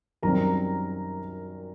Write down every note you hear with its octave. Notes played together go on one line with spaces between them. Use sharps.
F#2 D#3 G3 C4 A#4 A#5